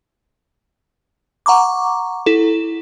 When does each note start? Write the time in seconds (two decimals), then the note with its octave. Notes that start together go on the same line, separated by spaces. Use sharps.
1.46 F#5 A#5 C#6 D6
2.26 E4 A4